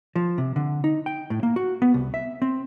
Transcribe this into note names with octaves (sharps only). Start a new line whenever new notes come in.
F3
C3
D3
D#4
G5
A2
A#3
F#4
B3
C2
E5
C4